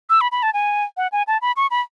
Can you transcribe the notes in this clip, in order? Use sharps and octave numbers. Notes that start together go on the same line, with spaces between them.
E6
B5
B5
A5
G#5
F#5
G#5
A5
B5
C#6
B5